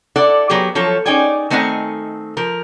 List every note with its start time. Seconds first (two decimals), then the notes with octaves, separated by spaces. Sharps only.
0.16 E4 A4 D5 F#5
0.50 F#3 B3 G4 G#4
0.75 F3 F#3 A4 C#5
1.06 C#4 D#4 G#4 D5 G5 G#5
1.50 D#3 A3 C4 D#5 F#5 G#5
2.37 F3 A#4